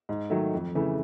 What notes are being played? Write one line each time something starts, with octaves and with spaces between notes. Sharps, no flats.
G#2
D#3 F#3 A3
F2
C#3 E3 A3